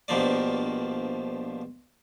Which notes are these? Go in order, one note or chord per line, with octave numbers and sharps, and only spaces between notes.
A#1 G2 B2 F3 A#3 D5